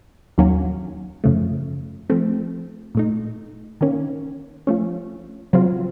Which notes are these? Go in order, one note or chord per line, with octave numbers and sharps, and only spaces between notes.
D#2 D#3 F#3 A#3 C#4
F#2 C#3 F3 A3
F3 A3 C4
A#2 A3 D#4
D#3 A#3 C#4
F3 A3 C#4
C#3 F#3 C4 F4